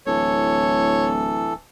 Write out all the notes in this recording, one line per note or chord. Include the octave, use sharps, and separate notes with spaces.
D1 E3 A4 C#5